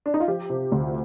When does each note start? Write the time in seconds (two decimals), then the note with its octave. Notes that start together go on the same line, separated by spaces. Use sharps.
0.06 D4
0.14 D#4
0.20 F4
0.28 F3 G4
0.50 C3
0.72 D2